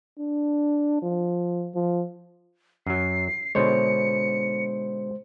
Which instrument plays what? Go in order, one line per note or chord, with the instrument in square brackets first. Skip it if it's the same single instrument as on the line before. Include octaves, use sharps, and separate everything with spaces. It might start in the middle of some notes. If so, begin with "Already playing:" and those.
[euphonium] D4
F3
F3
[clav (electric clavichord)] F#2 F#3 [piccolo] C7
[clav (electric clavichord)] B2 D3 C#5 [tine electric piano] G#3 C5 [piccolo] C#7